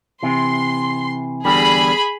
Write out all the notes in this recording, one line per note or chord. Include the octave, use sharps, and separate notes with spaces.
C3 E3 C6
E2 D3 G3 G#4 B5